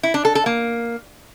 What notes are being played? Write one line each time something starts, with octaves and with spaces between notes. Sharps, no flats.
E4
D4
A4
A4
A#3